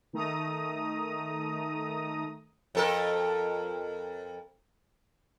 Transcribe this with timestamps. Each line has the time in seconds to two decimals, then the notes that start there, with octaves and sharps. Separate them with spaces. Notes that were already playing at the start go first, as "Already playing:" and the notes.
0.13 D#3 A3 A#5 D#6
2.75 F2 A4 A#4